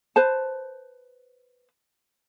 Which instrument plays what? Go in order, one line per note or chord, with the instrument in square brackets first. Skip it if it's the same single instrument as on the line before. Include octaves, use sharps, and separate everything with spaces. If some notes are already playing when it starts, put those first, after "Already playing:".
[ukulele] B4 C5 A5